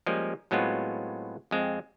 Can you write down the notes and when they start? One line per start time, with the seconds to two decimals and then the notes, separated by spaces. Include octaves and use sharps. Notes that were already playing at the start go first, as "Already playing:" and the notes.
0.06 F3 G3 G#3 A#3 C#4
0.51 A2 F#3 G#3 B3 C4 F4
1.51 F2 G#3 C4